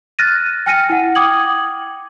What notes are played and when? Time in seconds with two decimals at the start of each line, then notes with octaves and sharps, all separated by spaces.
0.19 F6 F#6 A6 A#6 D#7
0.66 G5 G#5 F6 A#6 C#7 D#7
0.89 E4 F#5
1.15 G5 D6 D#6 G#6 F#7